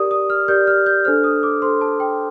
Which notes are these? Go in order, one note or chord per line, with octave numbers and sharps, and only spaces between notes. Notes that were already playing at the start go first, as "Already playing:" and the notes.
Already playing: G4 A#4 D5 D#6
D#6
F6
G4 A#4 D5 G6
F6
G6
D4 A4 C5 F6
D#6
D6
D4 A4 C5 C6
A5
G5